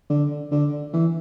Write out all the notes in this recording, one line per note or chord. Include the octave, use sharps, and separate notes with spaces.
D3
D3
E3